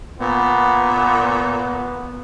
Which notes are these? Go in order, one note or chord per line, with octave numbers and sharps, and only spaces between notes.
A#2 B3